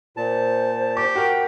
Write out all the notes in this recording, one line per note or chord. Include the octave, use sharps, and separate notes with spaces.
A#2 C5 A5
G4 D6
F#4 A#4 G5